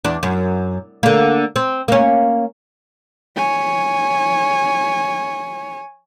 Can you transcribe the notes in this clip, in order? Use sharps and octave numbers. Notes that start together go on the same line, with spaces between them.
E2 D4
F#2
D3 A#3
C4
A#3 C#4
C#5 G#5